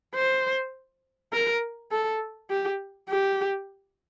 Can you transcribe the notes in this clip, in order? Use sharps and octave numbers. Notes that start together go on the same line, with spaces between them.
C5
A#4
A4
G4
G4